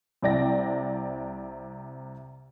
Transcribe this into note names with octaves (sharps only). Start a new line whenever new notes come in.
C2 C3 D5 G5 A#6